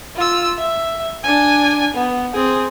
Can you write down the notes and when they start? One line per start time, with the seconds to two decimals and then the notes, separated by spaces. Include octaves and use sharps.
0.16 F4 E6
0.59 E5
1.24 D4 G#5
1.95 B3
2.34 C4 G#4